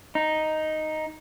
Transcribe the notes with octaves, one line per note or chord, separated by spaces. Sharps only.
D#4